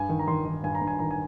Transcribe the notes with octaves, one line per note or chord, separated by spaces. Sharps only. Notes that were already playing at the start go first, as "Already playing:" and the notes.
Already playing: G2 G#5
D#3
A#5
D#3 C6
D#3
G2 G#5
A#5
G2
G#5
D#3 A#5
G#5